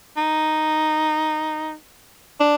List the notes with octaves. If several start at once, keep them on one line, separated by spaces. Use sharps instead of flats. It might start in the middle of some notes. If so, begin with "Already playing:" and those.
D#4
D4